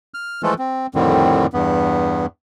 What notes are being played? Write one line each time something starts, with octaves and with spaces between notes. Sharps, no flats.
F6
E3 F3 G#3 A3 F4 A4
C4
F2 A2 D3 D#3 G3 C4
E2 G2 B3